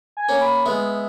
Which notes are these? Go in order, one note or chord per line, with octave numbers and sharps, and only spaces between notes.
G#5
A#3 C#4
B5
G#3 B3 E5